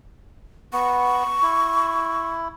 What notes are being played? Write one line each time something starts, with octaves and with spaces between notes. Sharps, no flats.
B3 C#6
E4